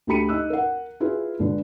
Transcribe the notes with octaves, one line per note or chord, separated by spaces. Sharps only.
D2 A3 G4 B5 C#7 D#7
D#4 E6 F#6
A#4 F#5
E4 F4 G#4 B4
E1 D3 B4